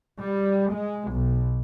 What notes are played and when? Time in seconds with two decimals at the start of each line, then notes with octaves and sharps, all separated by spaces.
0.20 G3
0.72 G#3
1.10 B1